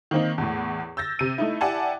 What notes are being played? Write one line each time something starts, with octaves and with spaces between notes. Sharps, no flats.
D#3 A#3 C4 D#4
E2 A2
E6 G6 A6 A#6
C3 D#7
A3 D#4 E4
E4 G4 D5 F#5 G#5 A5